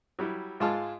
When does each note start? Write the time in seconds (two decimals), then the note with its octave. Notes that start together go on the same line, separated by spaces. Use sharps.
0.19 F#3 G3 E4
0.60 G#2 G#3 F4 A5 C6 F6